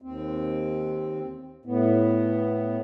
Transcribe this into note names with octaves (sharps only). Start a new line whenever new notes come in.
D#2 C4
A2 B3